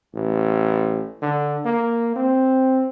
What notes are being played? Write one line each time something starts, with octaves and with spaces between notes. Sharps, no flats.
A1
D3
A#3
C4